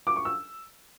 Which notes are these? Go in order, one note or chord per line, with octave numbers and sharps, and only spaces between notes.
D6
C#6
E6